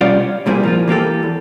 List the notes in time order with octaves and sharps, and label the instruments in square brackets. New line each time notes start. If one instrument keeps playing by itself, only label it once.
[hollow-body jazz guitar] C3 G3 C#4 F4 D5 F5
C#5
C2 A#2 G3 C4 E4 G#4
F3 A#3 F4
E3 A#3 G4 A4
E2